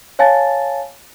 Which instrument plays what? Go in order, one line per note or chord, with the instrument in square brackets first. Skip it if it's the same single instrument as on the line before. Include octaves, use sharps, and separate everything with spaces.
[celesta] C#5 F5 G#5 A5 A6